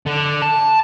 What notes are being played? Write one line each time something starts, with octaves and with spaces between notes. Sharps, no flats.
D3
A5